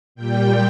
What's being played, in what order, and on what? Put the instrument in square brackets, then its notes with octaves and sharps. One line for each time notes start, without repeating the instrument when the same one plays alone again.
[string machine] A#2 G3 G5